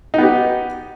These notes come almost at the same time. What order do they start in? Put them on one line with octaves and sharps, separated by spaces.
D#4 B3 G4